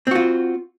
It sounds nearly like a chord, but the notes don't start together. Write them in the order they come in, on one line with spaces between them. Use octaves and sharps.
C4 F#4 F4